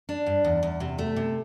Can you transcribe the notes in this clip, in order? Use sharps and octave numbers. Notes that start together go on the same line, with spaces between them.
D4
G2
E2
E2
C3
A3
C3